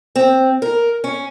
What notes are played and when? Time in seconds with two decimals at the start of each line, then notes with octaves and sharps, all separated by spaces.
0.16 C4
0.62 A#4
1.04 C#4